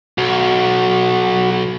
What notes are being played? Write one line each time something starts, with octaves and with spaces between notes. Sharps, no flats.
B1 F#4